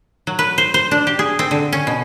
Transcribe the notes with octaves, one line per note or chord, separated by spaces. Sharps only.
F#3
B4
C5
C5
D4
G4
G#4
C4
D3
C#4
B2